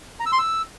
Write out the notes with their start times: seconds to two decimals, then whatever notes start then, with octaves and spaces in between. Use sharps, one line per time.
0.20 A#5
0.26 E6
0.32 C6
0.39 E6